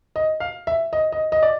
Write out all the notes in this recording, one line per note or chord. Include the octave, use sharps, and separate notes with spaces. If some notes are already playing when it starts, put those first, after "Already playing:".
D#5
F5
E5
D#5
D#5
D#5
D5